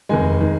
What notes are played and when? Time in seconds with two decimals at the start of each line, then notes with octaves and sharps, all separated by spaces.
0.09 F1 D#2 D#3 G#3 G#5
0.40 D#3 G#3